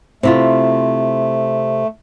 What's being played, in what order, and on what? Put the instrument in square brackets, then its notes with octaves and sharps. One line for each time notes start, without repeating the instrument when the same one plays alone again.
[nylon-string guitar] C3 E4 F4 [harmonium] A3